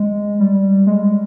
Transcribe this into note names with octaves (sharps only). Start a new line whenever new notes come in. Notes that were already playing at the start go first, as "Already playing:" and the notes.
Already playing: G#3
G3
G#3